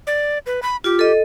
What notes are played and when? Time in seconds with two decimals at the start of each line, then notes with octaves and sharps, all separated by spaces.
0.07 D5
0.46 B4
0.63 B5
0.84 F4 G4
0.99 A4 D#5